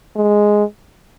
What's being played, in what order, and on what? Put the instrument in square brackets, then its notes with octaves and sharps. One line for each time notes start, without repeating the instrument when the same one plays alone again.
[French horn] G#3